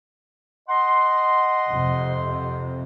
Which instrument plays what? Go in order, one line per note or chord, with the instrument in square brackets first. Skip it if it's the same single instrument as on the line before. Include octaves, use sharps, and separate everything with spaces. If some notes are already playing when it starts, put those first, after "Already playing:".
[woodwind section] D#5 F#5 C6
[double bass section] F2 C3